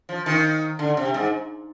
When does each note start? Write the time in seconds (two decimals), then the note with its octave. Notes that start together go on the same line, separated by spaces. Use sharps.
0.09 F3
0.26 D#3
0.79 D3
0.97 C3
1.14 G#2